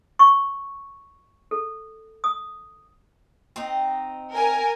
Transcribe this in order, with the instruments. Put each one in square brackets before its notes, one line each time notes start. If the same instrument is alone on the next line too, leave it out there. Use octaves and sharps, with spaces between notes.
[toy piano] C#6
A4
D#6
[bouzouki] C4 D#4
[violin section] A#4 G#5